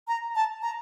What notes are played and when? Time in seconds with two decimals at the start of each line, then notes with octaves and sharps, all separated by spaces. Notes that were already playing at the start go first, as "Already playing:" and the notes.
0.08 A#5
0.35 A5
0.62 A#5